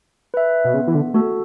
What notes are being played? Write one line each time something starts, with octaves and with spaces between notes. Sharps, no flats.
B4 E5
B2
C#3 B3
E3
D3
A3 F#4 A4